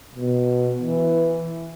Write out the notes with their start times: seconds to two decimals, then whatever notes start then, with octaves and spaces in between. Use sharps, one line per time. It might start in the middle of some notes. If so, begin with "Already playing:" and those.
0.15 B2
0.82 E3